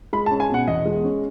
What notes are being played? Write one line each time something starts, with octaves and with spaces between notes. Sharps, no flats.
G#3 B5
A5
C#4
G#5
B2 F#5
E2 D#5
G#3
C#4